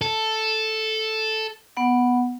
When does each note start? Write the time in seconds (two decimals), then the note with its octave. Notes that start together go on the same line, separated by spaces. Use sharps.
0.01 A4
1.77 B3 F#5